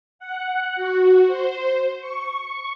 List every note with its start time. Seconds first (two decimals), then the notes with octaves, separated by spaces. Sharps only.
0.19 F#5
0.75 F#4
1.27 C5
1.99 C#6